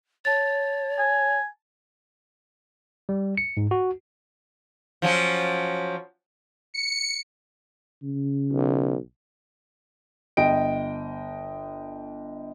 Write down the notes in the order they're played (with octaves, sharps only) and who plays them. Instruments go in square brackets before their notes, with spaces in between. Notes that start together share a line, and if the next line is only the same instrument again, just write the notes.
[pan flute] C#5 [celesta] A5 A6
[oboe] G#5
[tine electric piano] G3
C#7
G#2
F#4
[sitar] F3 F#3 C#4
[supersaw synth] C#7
[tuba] C#3
[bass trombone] B1
[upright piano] G1 D#5 G5 D7